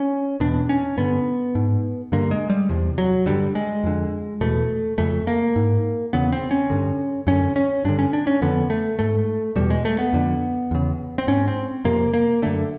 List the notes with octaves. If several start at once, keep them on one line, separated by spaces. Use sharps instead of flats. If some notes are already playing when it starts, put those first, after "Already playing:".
Already playing: C#4
E2 B2 D4
C#4
G2 D3 B3
G#2
G2 D3 A#3
G#3
G3
E2 C3
F#3
G2 D3 G3
G#3
F2 D3
E2 B2 A3
F2 C#3 A3
A#3
G#2
E2 C#3 B3
C4
C#4
G2 D3
F#2 D3 C#4
C#4
G2 D3 D4
C#4
D4
C#4
F2 D3 B3
A3
G#2 A3
E2 B2 G3
G#3
A3
B3
F2 D3
E2 C#3
C4
G#2 C#4
C4
F2 C3 A#3
A#3
F#2 D3 A3